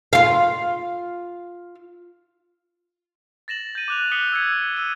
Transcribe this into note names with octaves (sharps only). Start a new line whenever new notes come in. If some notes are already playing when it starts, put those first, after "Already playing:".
F4 F5
A6 A#6 E7 F#7
G6 D#7
D6 F#6 F7
D#6 F#6 B6 C#7 F#7 G7
E6 G#6 C#7
E6 D#7